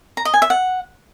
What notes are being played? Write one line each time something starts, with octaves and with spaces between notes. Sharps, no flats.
A#5
D#5
G#5
E5
F#5